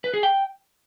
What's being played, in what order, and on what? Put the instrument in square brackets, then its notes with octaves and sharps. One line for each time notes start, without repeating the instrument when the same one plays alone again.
[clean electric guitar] B4
G#4
G5